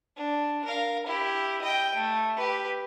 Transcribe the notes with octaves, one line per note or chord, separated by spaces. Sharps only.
D4
A#4 F5
E4 G4
D#5 G5
A3
G4 B4